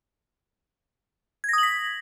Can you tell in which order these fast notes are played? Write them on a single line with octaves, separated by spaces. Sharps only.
G#6 A#6 D#6 F#7 B6